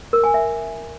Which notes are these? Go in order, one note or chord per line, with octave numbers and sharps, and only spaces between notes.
A#4
G#5
E5